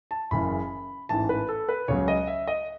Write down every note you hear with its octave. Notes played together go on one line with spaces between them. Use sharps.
A5
F#1 F#2 C#3 E3 B5
A1 G#2 E3 A5
B4
A4
B4
C#2 C#3 F#3 C#5
D#5
E5
D#5